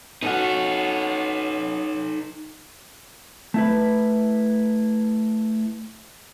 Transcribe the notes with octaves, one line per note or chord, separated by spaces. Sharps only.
C#4 D#4 F#4 A4
A3 E4 B4